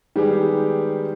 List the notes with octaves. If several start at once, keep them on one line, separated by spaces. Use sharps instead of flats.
D#3 G3 G#3 B3 G4 G#4